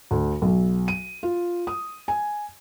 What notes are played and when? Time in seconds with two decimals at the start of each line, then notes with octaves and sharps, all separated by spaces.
0.11 D2
0.42 B1
0.88 D#7
1.23 F4
1.67 D#6
2.08 G#5